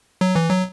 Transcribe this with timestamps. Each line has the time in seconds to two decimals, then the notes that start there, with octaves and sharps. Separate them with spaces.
0.21 F#3
0.36 E3
0.49 F#3